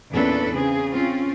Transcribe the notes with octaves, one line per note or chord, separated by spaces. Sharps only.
E2 A#2 C#4 D4 A4 B4
C#3 C4 G#4
C4 C#4 F4